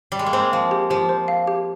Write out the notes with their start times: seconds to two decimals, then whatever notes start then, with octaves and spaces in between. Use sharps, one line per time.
0.12 G3
0.19 G#3
0.26 A#3
0.33 G#3 C4 C5
0.52 F3 F5
0.71 G4
0.90 F3 G4
1.09 C5
1.28 F5
1.47 G4